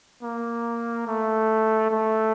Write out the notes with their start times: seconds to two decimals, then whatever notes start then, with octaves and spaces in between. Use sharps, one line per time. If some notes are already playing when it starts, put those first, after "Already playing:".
0.23 A#3
1.07 A3
1.91 A3